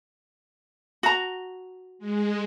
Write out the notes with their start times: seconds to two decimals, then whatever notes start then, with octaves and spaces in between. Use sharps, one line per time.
1.03 F#4 A#5
1.99 G#3